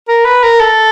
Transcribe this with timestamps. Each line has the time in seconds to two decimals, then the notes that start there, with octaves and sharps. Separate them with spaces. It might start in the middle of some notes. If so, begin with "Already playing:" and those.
0.08 A#4
0.25 B4
0.44 A#4
0.60 A4